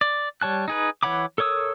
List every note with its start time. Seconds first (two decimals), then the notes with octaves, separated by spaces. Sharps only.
0.01 D5
0.42 G3 C#5 A5 F#6
0.68 D#4 G#4 B4
1.03 E3 C#5 F#5 B5 D6
1.38 A4 A#4 C#5 D#6 E6